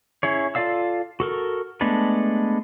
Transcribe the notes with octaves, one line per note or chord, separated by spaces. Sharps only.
C#4 E4 G#4 C#5
F4 A4 D5 F5 E6
F#4 A4 A#4
G#3 A3 B3 D4 A4